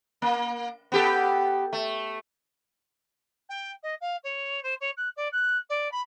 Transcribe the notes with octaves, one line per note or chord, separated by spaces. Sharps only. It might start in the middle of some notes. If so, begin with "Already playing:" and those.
A#3
B3 G4 A4
A3
G5
D#5
F5
C#5
C5
C#5
F#6
D5
F#6
D5
B5